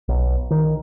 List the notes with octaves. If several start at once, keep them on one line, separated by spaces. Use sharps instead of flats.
B1
D#3